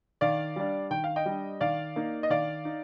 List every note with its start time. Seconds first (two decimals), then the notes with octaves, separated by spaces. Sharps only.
0.21 D#3 D5 F5
0.56 G3 D4
0.91 D#3 G5
1.04 F5
1.16 D#5 G5
1.26 G3 D4
1.61 D#3 D5 F5
1.96 A#3 D#4
2.23 D#5
2.30 D#3 D5 F5
2.65 D#4